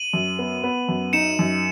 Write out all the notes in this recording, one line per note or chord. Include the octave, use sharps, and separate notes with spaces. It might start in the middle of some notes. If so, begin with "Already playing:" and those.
Already playing: D#7 F#7
F#2
B3
B3
F#2
D#4 C#7 E7
F#2